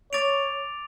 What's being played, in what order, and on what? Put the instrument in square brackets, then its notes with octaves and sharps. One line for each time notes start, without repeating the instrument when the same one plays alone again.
[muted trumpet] C#5 [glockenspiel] D6 A6 D7 F7